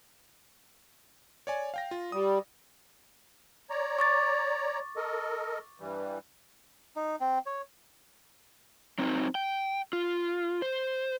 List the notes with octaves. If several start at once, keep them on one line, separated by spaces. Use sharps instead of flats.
C#5 D5 G#5
F5 G5 A#6
F4
G3 D#6
C#5 D5 A#5
C#6 D6 A6
A4 A#4 D#5
G2 E3 G3
D#4
C4
C#5
F#3 C4 D#4 C5
G5
F4
C5